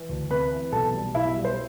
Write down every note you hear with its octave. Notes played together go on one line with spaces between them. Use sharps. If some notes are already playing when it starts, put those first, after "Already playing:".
Already playing: E3
D2
C3 B4 B5
E3
B1 A4 A5
G3
B1 E4 E5
G3
C5